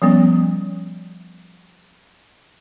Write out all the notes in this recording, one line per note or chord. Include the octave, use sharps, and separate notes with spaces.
F3 G3 B3 C#4